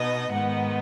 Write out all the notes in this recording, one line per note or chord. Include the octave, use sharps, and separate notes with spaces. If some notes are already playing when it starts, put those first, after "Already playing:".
Already playing: B2 B3 D#4 D#5
G#2 D#3 B3 D#4 F#5